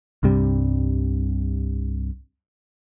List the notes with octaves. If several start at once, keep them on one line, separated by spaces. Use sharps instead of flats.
C2 G2 C3 G3